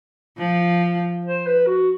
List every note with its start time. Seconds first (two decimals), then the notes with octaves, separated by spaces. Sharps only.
0.38 F3
1.25 C5
1.46 B4
1.66 F#4